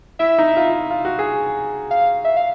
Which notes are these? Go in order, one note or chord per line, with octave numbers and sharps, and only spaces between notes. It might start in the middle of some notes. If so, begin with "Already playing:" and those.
E4 E5
D#4
F4
F4
F#4
G#4
F5
E5
F5